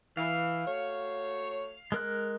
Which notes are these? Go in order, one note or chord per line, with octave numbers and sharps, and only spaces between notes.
E3 F5
A3 F#4 C#5
G#3 A#4 F#6